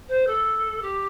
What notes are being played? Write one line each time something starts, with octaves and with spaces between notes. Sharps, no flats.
C5
A4
G4